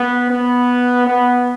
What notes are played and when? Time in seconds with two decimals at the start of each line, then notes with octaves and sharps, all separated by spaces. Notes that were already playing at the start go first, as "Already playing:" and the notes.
Already playing: B3
0.30 B3
1.07 B3